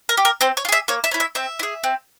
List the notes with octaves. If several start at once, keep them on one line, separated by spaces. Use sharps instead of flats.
A#4
G4
A#4
C4 C5
C#5
F4
G#4 E5
A#3 C#5
E5
C#4 E4
E5
C4 E5
E4
G#4
C4